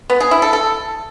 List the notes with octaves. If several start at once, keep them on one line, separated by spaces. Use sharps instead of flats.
B3
G#4
E4
A4
A4